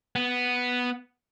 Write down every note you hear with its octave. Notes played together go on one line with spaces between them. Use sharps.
B3